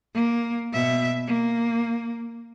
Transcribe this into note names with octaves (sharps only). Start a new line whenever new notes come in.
A#3
B2 E5
A#3